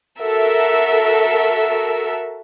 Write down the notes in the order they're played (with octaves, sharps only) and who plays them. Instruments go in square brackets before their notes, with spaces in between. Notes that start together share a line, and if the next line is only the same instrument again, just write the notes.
[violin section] F#4 A4 A#4 E5 E6